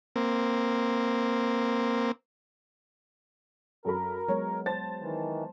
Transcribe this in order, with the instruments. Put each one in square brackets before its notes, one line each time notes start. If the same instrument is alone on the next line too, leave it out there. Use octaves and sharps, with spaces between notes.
[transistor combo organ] A#3 C4
[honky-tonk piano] F#2 A4 B5 [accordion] A#4
[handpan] F#3 G#3 B3 [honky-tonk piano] C#5
[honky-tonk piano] C5 A5 A6
[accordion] D#3 E3